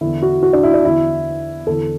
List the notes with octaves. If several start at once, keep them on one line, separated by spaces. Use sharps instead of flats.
E2 D3 E4
F#4
F#4
D4
E4
D4
E2 D3 E4
E2 D3 A4